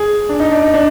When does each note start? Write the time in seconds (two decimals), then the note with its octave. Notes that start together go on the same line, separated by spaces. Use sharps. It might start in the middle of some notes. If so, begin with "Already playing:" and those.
Already playing: G#4
0.29 D4
0.40 D#4
0.52 D4
0.62 D#4
0.74 D4